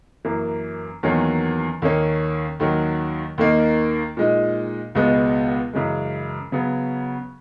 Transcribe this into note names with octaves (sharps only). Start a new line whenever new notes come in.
F#2 E3 A#3
E2 D#3 F#3 A#3 C#4
D#2 D#3 A#3 C#4
D#2 D#3 F#3
D#2 D#3 A#3 D#4
A#2 G#3 D#4
C#2 B2 G#3 B3
F#2 C#3 E3 G#3
C#3 F#3 B3